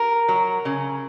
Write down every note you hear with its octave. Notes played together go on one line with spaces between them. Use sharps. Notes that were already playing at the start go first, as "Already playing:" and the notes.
Already playing: A#4
F#3
C#3